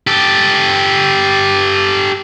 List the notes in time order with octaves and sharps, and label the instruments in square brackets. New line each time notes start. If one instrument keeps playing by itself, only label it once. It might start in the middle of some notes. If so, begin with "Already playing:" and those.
[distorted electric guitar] G4 A4